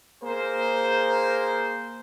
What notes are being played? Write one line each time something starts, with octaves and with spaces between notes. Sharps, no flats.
A#3 G#4 A#4 C5